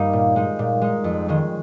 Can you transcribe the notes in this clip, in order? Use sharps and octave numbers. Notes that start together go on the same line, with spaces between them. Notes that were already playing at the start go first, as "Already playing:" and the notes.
Already playing: G2 G3 A#3 D#4
A#2
G#3 D#4
A#2
G#3 D#4
F2
D#3 G#3 C#4